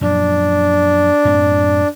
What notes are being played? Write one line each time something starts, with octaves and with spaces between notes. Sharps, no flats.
F#2 A#2 F3 D4
F#2 A2 C4